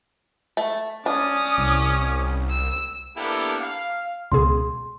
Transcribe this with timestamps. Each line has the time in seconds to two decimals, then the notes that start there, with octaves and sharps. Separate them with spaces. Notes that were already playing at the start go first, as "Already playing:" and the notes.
0.57 A3
1.06 C#4 D4 D6 D#6
1.58 C2
2.50 E6
3.16 A#3 B3 D4 E4 G4 A4
3.61 F5
4.32 C#2 B2 G#4 C6